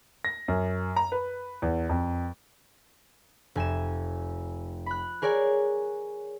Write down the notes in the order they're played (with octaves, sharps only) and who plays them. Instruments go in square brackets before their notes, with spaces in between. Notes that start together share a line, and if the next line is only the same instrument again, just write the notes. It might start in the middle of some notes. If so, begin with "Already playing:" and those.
[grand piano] A#6
F#2
A#5
B4
E2
F2
[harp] F1 G#5 D#7 E7
B5 F#6
G#4 A#4 C#5 D5 G#5